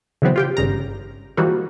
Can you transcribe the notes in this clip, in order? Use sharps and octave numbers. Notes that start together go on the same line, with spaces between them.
C#3 E3 F#3 B3 C4
F4 G4 G5
G#1 G2 C#3 A#5
E3 F3 G3 G#3 A#3 F#4